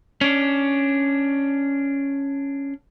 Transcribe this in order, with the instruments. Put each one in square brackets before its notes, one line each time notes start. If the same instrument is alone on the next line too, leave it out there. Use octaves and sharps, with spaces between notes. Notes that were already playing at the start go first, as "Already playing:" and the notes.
[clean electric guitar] C#4 D4